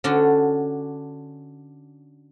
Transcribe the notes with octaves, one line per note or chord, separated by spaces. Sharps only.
D3 C#4 D4 F#4